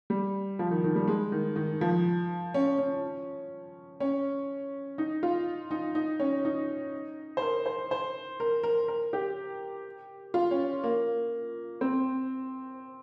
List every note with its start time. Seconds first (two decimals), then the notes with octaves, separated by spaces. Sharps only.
0.10 G3
0.59 F3
0.71 D#3
0.84 D#3
0.95 G3
1.08 G#3
1.32 D#3
1.56 D#3
1.81 F3
2.54 C#4
2.78 C#4
4.00 C#4
4.98 D#4
5.23 F4
5.71 D#4
5.95 D#4
6.20 C#4
6.45 D#4
7.37 C5
7.42 A#4
7.66 C5
7.91 C5
8.40 A#4
8.63 A#4
8.88 A#4
9.13 G4
10.34 F4
10.51 C#4
10.84 A#3
11.81 C4